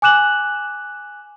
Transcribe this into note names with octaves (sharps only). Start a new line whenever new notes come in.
G#5 D6 F#6 E7 F#7